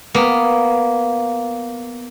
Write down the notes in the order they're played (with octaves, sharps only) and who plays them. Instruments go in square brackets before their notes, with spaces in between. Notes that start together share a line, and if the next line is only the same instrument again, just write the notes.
[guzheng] A#3 B3